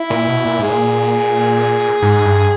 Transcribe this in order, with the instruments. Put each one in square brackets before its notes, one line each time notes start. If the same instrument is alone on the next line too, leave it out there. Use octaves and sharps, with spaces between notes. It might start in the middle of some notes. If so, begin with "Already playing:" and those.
Already playing: [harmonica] E4
[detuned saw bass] A#2
B2
A#2
[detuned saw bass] G#2 [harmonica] G#4
[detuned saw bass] A#2
G#2
G2